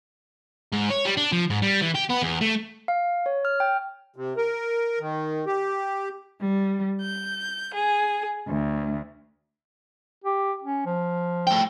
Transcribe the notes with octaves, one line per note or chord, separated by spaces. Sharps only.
G#2
C#5
G3
D4
F3
G#2
G3
E3
G4
B3
E2
A3
F5
C#5
F6
G5
C3
A#4
D#3
G4
G3
G6
G#4
D2
G4
C#4
F3
A3 G5